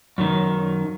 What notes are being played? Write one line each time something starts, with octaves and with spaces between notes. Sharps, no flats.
F#2 D#3